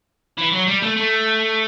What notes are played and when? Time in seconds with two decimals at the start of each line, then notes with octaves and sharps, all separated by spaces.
0.38 E3
0.53 F#3
0.68 G3
0.83 A3
0.97 A3